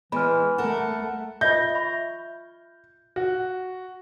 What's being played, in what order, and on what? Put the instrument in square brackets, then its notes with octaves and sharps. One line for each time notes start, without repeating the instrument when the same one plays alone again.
[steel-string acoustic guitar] E2 G#3 [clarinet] E3 [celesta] B5 F6
[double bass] A3 [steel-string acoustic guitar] A4 A#4 [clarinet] F#5
[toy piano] F4 D#5 E5 [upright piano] G6
[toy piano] E5 B5 C#6
[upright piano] F#4